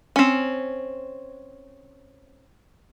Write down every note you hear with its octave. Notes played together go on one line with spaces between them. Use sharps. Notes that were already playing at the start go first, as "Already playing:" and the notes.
C4 C#4